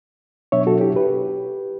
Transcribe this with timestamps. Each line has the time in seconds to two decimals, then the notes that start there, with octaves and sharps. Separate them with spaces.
0.52 B2 F#3 B3 D4 C#5 E5
0.67 F#4 A4
0.81 E4 G4
0.96 G4 B4